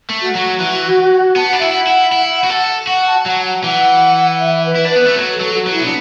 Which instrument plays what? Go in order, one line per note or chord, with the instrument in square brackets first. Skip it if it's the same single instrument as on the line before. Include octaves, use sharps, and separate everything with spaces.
[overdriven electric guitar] A3
[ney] F#4
[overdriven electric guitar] F#3
E3
[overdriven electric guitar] B3 [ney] A5
[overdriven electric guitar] D4 [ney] F#5
[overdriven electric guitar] E4 [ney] E5
[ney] F#5
[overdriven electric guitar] E4
E4
F#4
A4
[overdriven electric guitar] F#4 [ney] F#5
[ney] A5
[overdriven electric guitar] F#3 [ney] F#5
[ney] F#5
[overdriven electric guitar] E3 [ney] F#5
[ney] E5
B4
[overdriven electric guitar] E4
D4
[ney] B4
[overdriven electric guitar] B3
A3
F#3
[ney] A4
[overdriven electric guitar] F#3
[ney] F#4
[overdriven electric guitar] F#3
[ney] E4
[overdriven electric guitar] B3
[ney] D4